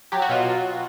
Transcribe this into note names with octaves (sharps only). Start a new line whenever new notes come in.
F#3 G4
F#4
B2 F4